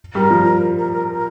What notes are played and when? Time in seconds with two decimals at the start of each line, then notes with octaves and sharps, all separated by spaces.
0.15 G3 A#4
0.31 F3
0.77 A#4
0.93 A#4
1.13 A#4